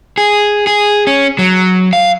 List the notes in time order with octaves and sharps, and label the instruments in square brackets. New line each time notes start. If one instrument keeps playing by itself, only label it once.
[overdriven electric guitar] G#4
G#4
C#4
F#3
F5